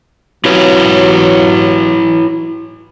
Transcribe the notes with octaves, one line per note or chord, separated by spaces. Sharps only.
F#3 E4 B4 C#5